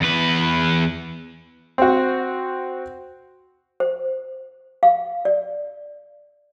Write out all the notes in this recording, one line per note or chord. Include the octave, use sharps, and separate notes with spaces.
E2 B4
C4 F#4
C5
F5
D5